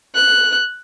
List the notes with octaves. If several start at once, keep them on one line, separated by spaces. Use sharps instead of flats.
F#6